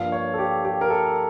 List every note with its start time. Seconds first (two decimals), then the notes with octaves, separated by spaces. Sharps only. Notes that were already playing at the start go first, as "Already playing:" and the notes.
Already playing: G2 F3 A#3 F5
0.12 C#5
0.34 A4
0.38 G4
0.65 G4
0.81 A#4
0.90 A4